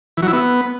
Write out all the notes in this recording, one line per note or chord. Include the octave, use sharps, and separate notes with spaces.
E3
F#3
E4
B3